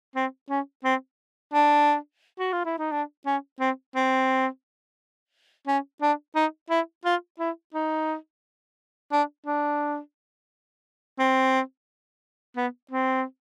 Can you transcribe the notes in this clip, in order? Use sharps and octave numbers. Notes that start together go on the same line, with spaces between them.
C4
C#4
C4
D4
F#4
F4
E4
D#4
D4
C#4
C4
C4
C#4
D4
D#4
E4
F4
E4
D#4
D4
D4
C4
B3
C4